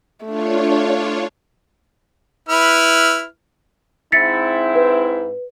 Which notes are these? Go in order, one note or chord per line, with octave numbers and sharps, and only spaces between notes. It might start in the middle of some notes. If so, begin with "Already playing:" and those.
A3 D4 F4 C#5
E4 B4 F6
G#2 C4 E4 A6 B6 C#7
B4